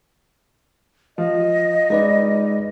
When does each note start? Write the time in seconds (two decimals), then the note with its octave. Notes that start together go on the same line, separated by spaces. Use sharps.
1.18 F3 D#5
1.90 G#3 D#4 B4 D5